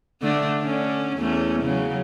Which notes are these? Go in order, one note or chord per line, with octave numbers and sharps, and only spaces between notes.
D3 A3 D4
D3 C#4
E2 A3 C#4
C#3 F#3